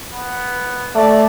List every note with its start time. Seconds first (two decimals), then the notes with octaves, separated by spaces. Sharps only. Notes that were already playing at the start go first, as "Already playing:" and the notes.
0.11 B3
0.95 A3 D5